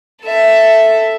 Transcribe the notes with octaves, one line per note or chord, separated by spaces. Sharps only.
A4 E5